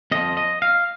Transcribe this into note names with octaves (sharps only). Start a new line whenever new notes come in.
F2 F3 D#5
D#5
F5